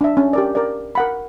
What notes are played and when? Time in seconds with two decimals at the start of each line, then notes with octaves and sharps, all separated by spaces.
0.01 D4 E5
0.17 C#4
0.33 G4 A#4 D5
0.55 A#4 D5
0.95 A#4 F#5 B5